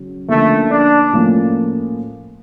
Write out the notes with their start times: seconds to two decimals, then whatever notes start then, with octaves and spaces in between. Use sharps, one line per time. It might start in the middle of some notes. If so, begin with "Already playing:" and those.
Already playing: C#3 F#3
0.29 D3 F3 A3 A#3 C#4
0.71 D4
1.13 A2 F3 A#3 C#4